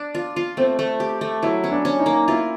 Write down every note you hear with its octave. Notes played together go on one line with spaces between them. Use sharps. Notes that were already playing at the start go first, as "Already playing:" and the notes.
Already playing: D4
F4
F4
A3 C4
A3
G4
A3
F#3 E4
C#4
D4
C#4
D#4
A#3
E4 F4